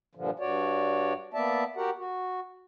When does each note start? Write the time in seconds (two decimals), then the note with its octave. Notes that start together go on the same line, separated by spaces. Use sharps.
0.15 G2 A#2 D3 F3
0.39 G2 F#4 C#5 D5
1.34 A#3 B3 D5 E5 A5
1.76 F#4 G4 A#4 F#5
1.98 F#4